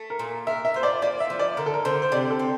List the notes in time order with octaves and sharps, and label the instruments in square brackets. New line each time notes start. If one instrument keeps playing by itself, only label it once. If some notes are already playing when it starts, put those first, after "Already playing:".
Already playing: [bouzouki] A3
[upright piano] A#4
[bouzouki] A#2
[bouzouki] A#4 [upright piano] E5
[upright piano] E5
[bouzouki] F4 [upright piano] C5
[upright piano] D5
[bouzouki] A#3 [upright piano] D5
[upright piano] E5
[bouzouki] F3
[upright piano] D5
[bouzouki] D3 [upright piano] A#4
[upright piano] A4
A#4
[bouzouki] D3 [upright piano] C5
[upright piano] C5
[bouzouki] C3 [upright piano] D5
[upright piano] A4
[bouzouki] C4